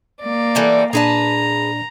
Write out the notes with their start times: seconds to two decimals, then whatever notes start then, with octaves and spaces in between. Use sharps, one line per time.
0.21 A#3 D5
0.55 E3 G3 A3
0.93 A#2 D4 G#4 B4 D5 A5 A#5